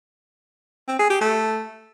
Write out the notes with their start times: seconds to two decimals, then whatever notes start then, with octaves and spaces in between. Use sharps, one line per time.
0.88 C4
0.99 G#4
1.10 G4
1.21 A3